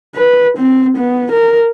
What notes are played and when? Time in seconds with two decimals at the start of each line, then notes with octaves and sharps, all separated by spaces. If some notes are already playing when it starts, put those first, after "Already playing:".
0.15 B4
0.57 C4
0.97 B3
1.32 A#4